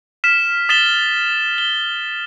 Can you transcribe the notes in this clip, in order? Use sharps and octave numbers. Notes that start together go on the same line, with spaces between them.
F6 B6 E7
D#6 A6 B6 E7 G7
G7